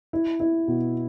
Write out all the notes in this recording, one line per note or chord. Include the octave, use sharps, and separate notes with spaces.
E4
E4
B2